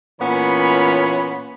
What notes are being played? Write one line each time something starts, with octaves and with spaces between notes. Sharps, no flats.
A#2 E3 B3 C#4 C#5 B5